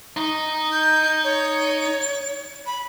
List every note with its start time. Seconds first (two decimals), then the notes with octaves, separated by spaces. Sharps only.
0.17 D#4
0.72 G6
1.24 C#5
2.66 B5